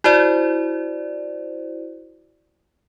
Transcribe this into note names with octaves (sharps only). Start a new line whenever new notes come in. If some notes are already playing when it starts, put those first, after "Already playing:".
E4 F#4 C5 D5